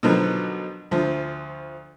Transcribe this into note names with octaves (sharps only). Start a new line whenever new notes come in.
B2 D3 D#3 F3 F#3 B3
D2 F3